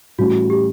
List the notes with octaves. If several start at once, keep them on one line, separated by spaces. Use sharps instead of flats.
A2 E3 G3 C#4 E4 F#4
G4